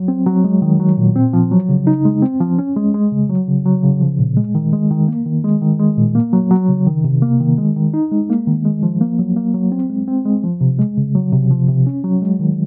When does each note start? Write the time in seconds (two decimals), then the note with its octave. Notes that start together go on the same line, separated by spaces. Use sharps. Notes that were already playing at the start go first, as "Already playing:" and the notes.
Already playing: F#3
0.08 C4
0.26 F#3
0.44 G#3
0.62 D#3
0.80 F#3
0.97 A#2
1.16 C4
1.33 F3
1.51 F#3
1.69 C#3
1.87 D#4
2.05 G#3
2.22 C4
2.40 F3
2.59 C#4
2.76 G#3
2.94 G#3
3.11 C#3
3.30 F#3
3.48 C#3
3.66 F#3
3.83 C#3
4.01 F3
4.19 A#2
4.37 G#3
4.55 D#3
4.73 G#3
4.91 D#3
5.08 A#3
5.26 D#3
5.44 G#3
5.62 D#3
5.80 G#3
5.97 A#2
6.15 A#3
6.33 F#3
6.51 F#3
6.69 C#3
6.87 D#3
7.04 C3
7.22 A#3
7.40 D#3
7.58 G#3
7.76 D#3
7.94 D#4
8.12 G#3
8.30 A#3
8.47 D#3
8.65 G#3
8.83 F3
9.01 A#3
9.19 F#3
9.36 A#3
9.54 F#3
9.72 C4
9.90 G#3
10.08 C4
10.25 G#3
10.44 F3
10.61 C3
10.79 G#3
10.97 C#3
11.15 F#3
11.33 C3
11.51 F3
11.69 C3
11.87 C#4
12.04 F#3
12.22 G#3
12.40 D#3